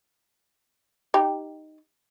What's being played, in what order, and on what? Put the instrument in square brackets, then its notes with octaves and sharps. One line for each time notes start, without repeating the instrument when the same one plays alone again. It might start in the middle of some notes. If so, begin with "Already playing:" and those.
[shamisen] D#4 G4